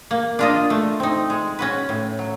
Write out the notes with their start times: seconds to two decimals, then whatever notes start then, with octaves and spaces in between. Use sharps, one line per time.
0.11 A#3
0.39 D4 F4 A#4 D#5
0.70 A3
1.00 C4 D#4
1.30 G#3
1.59 C#4 F#4 B4
1.89 A2
2.19 F#3